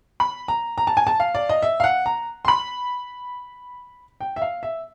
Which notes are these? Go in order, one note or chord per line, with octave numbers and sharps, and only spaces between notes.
B5
A#5
A#5
A5
G#5
A5
F5
D5
D#5
E5
F5
F#5
A#5
C6
B5
G5
E5
F5
E5